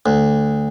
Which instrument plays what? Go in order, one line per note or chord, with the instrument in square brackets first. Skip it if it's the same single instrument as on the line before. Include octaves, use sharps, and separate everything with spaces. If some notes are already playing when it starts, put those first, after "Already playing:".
[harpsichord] D2